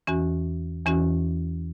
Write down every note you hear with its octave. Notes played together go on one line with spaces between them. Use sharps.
E2 E3 C#4 F#4
E2 E3 C#4 F#4